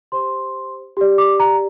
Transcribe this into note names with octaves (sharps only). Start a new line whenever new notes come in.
G4 C5 C6
G4 D5
D6
A#5